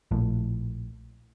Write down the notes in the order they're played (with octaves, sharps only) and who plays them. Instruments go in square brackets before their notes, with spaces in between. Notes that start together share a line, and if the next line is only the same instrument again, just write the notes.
[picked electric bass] A#1 A2